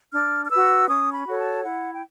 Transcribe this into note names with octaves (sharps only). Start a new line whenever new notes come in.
D4 F6
F6
F#4 B4 E6
C#4 D#6
B5
F#4 A4 C#5
A5
E4 F#5
G5